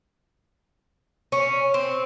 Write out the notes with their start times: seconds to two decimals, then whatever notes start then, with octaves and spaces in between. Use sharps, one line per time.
1.32 C#4
1.74 C4